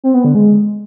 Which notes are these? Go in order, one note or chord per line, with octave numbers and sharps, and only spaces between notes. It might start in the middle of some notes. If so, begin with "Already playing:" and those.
C4
B3
D3
G#3